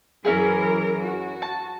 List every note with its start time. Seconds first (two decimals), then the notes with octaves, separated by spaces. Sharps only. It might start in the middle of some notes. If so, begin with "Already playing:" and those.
0.25 F#2 E3 C#4 E4 G#4 A#4
1.02 F#4
1.42 A5